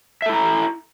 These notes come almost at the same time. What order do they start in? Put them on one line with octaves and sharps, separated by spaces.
E5 A4 E4 A#5